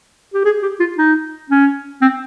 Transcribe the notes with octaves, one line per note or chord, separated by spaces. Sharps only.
G4
G#4
G4
F4
D#4
C#4
C4